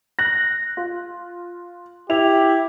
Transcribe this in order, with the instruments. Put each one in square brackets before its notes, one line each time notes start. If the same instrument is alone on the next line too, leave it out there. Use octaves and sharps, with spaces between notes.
[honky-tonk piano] F#6 A#6
F4
[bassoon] E4 [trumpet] G4 [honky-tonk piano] F7